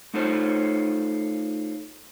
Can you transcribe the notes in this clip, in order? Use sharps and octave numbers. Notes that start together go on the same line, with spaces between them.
A3 D#4 F4 A4 C5 C#5